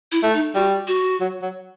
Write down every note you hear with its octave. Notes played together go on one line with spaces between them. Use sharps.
E4
A3
D#4
G3 F#4
F#4
F#3
F#3